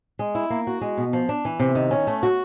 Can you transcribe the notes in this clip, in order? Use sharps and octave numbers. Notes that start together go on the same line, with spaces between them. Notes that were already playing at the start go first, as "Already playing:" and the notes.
G#3
E4
A#3
F#4
G#3
B2
F3
D4
E3
C3
D#3
C#4
A3
F#4